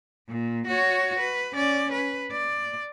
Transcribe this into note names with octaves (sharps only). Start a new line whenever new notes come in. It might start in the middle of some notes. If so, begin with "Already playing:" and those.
A#2
F#4 C#5
B4
C#4 D5
B4
D5